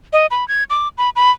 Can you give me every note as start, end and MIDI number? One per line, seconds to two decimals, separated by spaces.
0.13 0.26 75
0.31 0.47 83
0.48 0.64 92
0.70 0.88 86
0.98 1.10 83
1.16 1.31 83